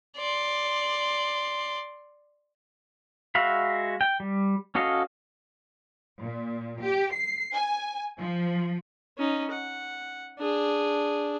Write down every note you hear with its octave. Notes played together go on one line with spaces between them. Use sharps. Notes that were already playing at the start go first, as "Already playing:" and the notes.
D5 C6
G#3 F#4 E5 F5 B5
G5
G3
C#4 F#4 A4 D#5 F5
A#2
G4
C7
G#5
F3
C#4 D#4
F#5
D4 G#4